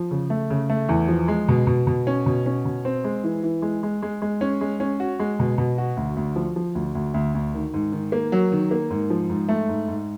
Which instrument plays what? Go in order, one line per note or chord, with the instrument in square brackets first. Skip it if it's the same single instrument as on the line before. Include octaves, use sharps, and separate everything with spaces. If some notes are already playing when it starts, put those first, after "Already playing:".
Already playing: [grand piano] F3
C#3
A3
C#3
A3
E2
F3
G#3
B2
B2
B2
C#4
B2
C#4
B2
C4
G#3
E3
E3
G#3
G#3
G#3
G#3
C#4
G#3
C#4
F#4
G#3
B2
B2
F#4
D2
D2
F3
F3
D2
D2
D2
D2
D#3
G#2
D#3
A#3
F#3
D#3
A#3
G#2
F3
G#2
A3
G#2
G#2